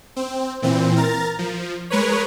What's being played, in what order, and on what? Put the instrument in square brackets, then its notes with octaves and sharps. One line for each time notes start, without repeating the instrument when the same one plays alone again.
[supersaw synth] C4
A#2 E3 C4
A#4 A#5 A6
F3
G#3 A#4 B4 C#5